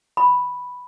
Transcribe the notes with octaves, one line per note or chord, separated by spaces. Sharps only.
B5